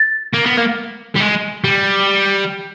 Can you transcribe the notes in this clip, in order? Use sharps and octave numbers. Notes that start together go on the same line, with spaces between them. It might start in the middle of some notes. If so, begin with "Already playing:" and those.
Already playing: A6
A#3
B3
A#3
G3
G#3
G3